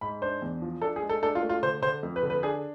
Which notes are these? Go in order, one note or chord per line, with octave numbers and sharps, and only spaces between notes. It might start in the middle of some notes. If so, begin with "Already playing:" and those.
G#2 B5
D4 C5
E2
F3
D4 A4
G#4
G#3
A4
D4 A4
F4
A3
F4
D3 C5
D3 C5
F2
B4
D3
B4
D4 G#4